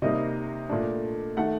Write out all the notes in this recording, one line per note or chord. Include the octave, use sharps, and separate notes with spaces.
C3 G3 A#3 D#4 D#5
A#2 A3 D4
D#3 A3 F#5